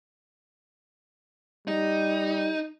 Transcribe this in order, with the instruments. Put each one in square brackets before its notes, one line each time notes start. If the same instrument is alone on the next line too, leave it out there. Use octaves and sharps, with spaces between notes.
[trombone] G3 [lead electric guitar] D#4